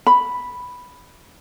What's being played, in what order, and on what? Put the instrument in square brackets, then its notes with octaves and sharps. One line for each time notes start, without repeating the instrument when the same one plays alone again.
[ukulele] B5